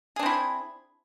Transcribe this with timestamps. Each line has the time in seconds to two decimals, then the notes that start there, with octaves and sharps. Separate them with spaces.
0.16 G#4
0.19 D4
0.23 C4
0.26 E4